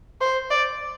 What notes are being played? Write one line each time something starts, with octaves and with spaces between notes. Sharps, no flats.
C5
D5